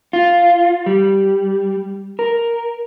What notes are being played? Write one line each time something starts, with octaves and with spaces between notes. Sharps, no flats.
F4
G3
A#4